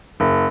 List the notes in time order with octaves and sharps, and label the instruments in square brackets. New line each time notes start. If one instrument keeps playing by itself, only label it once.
[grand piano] F#1